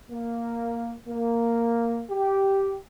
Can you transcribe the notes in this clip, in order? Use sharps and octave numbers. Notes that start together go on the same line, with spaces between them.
A#3
A#3
G4